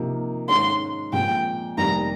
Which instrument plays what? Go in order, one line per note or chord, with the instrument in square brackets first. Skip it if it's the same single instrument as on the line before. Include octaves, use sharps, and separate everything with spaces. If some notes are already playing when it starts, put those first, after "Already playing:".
Already playing: [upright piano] C3 F3 A#3 D#4
[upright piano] G#2 D#3 G#3 C#4 [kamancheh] C6
[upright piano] A#2 F3 G#3 C4 [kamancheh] G5
[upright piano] F1 F2 D#3 G3 A#3 [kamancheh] A#5